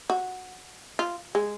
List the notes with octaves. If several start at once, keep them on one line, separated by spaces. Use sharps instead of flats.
F#4
F4
G#3